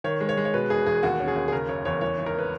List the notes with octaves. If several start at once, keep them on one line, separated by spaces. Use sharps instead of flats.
D#3 C#5
G#3
C#5
G#3
C#5
B2 B4
E1 G#4
E2 G#4
D#2 F#4
C#4
G#4
D#2
G#4
C#3 A#4
F#1 C#5
E2 C#5
E3 C#5
G#1
A#4
B4